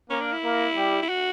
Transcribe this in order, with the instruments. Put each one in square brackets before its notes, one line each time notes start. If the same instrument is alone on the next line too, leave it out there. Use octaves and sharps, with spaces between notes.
[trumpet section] A#3 A#4 [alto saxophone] C#4
[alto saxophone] D4
E4
[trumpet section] A#3 A#4
G3 G4
[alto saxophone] E4
F#4